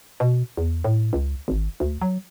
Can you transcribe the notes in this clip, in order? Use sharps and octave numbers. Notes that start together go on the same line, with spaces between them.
B2
E2
A2
C#2
G#1
D2
F#3